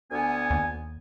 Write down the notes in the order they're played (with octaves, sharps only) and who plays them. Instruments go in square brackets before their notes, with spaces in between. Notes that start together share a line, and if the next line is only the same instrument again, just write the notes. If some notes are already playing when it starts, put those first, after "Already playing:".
[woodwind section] D2 B3 G#5
[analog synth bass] D#2